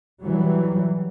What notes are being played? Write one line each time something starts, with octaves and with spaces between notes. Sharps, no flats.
E3 F#3 G3